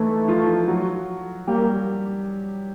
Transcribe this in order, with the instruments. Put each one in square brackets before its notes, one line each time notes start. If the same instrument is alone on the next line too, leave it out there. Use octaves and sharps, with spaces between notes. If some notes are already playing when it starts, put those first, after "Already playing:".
Already playing: [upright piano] E3 D#4 E4 [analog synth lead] A3
[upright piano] F3 F4
F#3 F#4
[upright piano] G3 G4 [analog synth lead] A#3